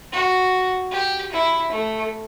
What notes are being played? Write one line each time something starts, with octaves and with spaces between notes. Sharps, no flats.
F#4
G4
E4
A3